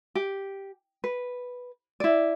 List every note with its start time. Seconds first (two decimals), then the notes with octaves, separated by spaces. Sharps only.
0.15 G4
1.04 B4
2.00 E4 D5